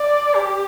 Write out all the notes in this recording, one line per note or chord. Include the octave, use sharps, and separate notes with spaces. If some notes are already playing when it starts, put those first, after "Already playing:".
Already playing: D5
G4